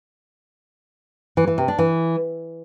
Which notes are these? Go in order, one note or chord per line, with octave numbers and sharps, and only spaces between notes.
E3
E3
C3
D4
E3